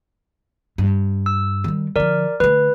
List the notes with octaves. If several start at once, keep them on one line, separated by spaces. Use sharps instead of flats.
G2
E6
D#3 G3
D3 F3 A#4 D5
D3 A3 B4